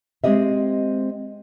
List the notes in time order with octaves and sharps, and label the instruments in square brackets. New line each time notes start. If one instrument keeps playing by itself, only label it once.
[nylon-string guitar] G#3 C4 G4 D#5 E5